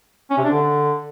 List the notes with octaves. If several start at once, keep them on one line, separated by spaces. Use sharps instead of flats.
C#4
C3
D4
D3